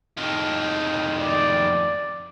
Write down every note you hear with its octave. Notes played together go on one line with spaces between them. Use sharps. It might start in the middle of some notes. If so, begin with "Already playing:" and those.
F2 D#3
D5